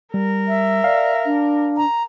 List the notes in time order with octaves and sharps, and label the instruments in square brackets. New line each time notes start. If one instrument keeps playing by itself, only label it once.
[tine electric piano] G3 [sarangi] A#4
[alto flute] E5
[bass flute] D5 [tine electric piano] F5
[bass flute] D4
[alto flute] A#5